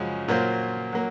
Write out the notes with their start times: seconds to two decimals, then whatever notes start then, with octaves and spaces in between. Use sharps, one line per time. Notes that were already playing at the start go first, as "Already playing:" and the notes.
Already playing: F#2 C#3 F3 G#3
0.28 A#2 F#3 A#3 F4 C5
0.92 F#3 A#3